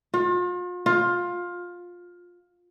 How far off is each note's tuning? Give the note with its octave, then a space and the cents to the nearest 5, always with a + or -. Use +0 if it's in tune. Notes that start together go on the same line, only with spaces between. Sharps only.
F4 +40
F4 +15